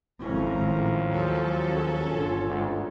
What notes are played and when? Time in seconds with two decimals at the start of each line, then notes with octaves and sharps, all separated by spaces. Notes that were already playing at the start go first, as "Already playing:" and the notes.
0.22 G#1 F2 F3 C#4 E4 A#4 A#5
0.54 A2 D#3 G3 G#3
1.08 D#2 F#3 C#4 A4
1.68 G#4 A#4
2.07 G1 D3 F4 C#5
2.48 D2 G#2